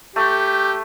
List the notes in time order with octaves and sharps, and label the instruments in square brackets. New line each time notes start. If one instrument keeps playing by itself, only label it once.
[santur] A3 [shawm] G4